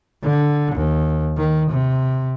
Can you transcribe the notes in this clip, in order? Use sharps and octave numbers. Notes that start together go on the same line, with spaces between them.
D3
D#2
D#3
C3